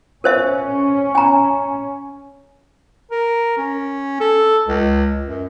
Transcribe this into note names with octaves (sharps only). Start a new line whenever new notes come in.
C#4 A#4 C5 E5
G#5 A#5
A#4
C#4
A4
C#2
F#2